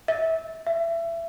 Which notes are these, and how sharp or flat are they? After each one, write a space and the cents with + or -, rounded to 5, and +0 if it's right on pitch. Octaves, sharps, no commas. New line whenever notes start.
E5 -20
E5 +25